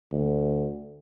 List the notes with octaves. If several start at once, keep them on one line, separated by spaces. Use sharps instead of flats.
D2